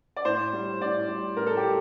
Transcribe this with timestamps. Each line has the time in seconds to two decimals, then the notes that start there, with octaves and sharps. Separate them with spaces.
0.16 D5
0.25 A2 C5
0.53 G3
0.81 A2 D5
1.08 G3
1.37 A2 A#4
1.46 A4
1.57 G4
1.64 G3